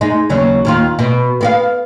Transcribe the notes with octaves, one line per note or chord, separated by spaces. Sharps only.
G#3 D#4
D#2 C#3 F#3
D#2 D#3 F4
B2
B3 F#4 F5